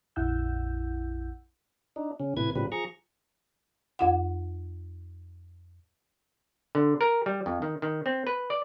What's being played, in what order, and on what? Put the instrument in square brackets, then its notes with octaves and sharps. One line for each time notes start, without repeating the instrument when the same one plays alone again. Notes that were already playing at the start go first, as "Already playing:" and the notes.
[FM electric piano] A#1 F2 E4 F#5 E6 G6
[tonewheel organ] D4 D#4
C#3 C#4
A2 C3 E3 B4 G#6
A2 C#3 F3 G3 B4
F3 G#4 A#5 C#6
[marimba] F2 F4 F#5
[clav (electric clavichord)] D3
A#4
G3
F2
D#3
D#3
C4
B4
D5